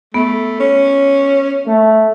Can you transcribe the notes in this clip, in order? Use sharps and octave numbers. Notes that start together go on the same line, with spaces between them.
A3 B3
C#4
A3